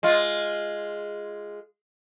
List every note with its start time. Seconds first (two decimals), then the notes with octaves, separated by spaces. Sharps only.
0.03 G#3 F4